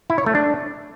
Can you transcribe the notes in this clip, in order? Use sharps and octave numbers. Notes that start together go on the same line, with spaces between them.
E4
C#5
A3
D4